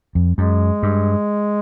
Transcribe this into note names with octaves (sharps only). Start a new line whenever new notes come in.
F2
F#2 G#3
G2